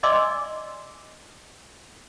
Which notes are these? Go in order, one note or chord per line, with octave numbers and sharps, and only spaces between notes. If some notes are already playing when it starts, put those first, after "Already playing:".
D5 D#5 G#5 C6 D6 E6